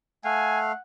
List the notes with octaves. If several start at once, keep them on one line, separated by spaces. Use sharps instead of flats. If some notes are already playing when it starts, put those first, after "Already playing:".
A3 F5 F#5 G#5